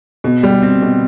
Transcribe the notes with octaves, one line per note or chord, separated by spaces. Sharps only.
B2
G3
C4
B2